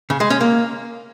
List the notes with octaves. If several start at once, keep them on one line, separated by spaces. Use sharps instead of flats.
C#3
G#3
C#4
A#3